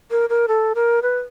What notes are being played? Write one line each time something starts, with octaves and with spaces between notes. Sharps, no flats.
A#4
A#4
A4
A#4
B4